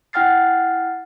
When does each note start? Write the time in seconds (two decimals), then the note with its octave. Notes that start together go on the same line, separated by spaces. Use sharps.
0.13 E4 F#5 G5 F6 A6 C7